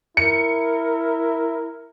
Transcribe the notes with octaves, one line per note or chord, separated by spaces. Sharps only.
E4 A#4 C#7